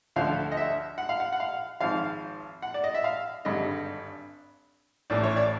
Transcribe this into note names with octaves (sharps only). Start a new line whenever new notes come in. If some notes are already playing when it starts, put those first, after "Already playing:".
D2 D3 F3 F5
D#5
E5
F#5
F5
F#5
F#5
F5
G#1 G#2 F3 F5
F#5
D5
D#5
E5
F5
G#1 G2 D3 D#5
A1 A2 E3 D5
C#5
D5